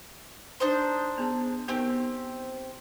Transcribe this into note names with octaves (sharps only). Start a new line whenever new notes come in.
D4 D#4 C5
B3 G#4 A5
B3 C4 D#4 G4 A#4